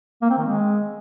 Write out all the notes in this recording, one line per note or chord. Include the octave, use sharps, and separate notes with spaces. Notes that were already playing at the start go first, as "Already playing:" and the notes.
A#3
C4
D#3
G#3